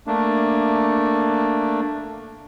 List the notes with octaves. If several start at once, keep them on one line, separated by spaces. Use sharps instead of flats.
A3 A#3 D4